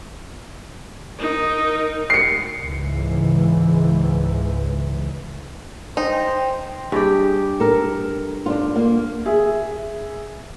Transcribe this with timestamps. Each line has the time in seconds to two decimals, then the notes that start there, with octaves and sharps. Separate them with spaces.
1.19 D#4 A#4
2.10 C7 C#7
2.61 C#2 G#2 E3
5.97 D#4 C5 G5
6.92 G2 G4 G#4
7.60 A4 A#4
8.46 D4 D#4 F4
8.76 A#3
9.26 G#4 E5